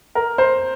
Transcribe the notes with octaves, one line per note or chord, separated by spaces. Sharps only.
A#4
C5